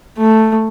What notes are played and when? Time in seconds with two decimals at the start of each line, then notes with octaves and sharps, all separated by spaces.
0.18 A3